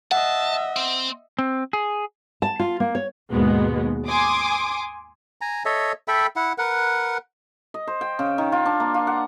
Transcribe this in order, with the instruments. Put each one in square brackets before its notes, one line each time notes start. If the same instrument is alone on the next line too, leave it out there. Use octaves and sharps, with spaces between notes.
[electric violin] D#5 E5 [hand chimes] F#5 [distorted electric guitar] A5
[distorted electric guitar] C4
[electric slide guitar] C4
G#4
[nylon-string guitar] A5
F4
A#3
C#5
[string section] D#2 G#2 B2 G#3 B3
G#5 C6 D6 D#6
[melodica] G#5 A#5
A4 C#5 D#5 E5
A4 E5 G5 B5
E4 F#5
A#4 B4 F#5
[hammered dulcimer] D#5
C5
G5
C#3
D#3
F4
D4
A#3
F4
F#5